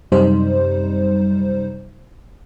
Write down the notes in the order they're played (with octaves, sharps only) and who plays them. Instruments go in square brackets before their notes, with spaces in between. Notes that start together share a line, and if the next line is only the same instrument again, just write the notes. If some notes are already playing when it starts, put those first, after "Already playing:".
[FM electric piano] F#2 C3 G3 D#4 C5